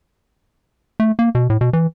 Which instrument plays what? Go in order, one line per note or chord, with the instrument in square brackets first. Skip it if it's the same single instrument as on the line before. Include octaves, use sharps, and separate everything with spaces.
[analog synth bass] A3
A#3
B2
A2
B2
E3